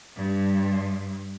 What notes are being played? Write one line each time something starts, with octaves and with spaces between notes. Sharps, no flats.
G2